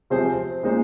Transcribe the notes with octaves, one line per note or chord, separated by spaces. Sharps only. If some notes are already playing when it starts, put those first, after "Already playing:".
C3 F3 C4 G#4 C5
A#2 G#3 D#4 C5